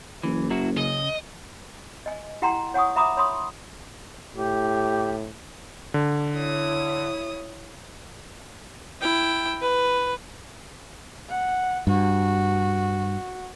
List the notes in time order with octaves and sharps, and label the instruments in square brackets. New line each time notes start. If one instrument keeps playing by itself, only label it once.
[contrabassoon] F#1 [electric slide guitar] E3
[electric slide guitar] F#3 E4 F#4
[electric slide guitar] C#3 [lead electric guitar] D#5
[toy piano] D#5 G#5
E4 G4 F#5 G5 A#5 C6
C#5 F#5 G#5 C#6 D#6
E5 A#5 B5 D6 D#6
C#5 B5 C6 D#6
[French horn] A2 [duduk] G4
[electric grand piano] D3
[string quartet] E4 C#5 D#6
[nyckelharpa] E4 G5
B4
[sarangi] F#5
[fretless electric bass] G2 [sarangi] F#4